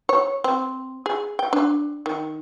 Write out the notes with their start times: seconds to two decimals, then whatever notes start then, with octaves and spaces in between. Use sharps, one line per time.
0.09 C#5
0.44 C4
1.06 G#4
1.39 G5
1.53 D4
2.06 D#3